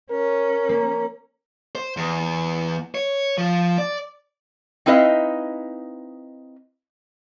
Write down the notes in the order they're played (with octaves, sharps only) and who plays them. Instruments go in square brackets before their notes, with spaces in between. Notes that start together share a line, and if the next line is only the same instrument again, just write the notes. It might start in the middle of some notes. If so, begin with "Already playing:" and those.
[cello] C#4 [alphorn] A#4
[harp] A#3
[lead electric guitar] C5
E2
C#5
F3
D5
[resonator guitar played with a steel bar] C4 D#4 E4 B4 D#5 F5